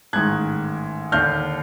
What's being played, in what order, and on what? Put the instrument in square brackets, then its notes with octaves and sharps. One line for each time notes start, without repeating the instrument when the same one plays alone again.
[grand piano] A1 G#2 D#3 F#6 G#6
D#2 D3 F6 G6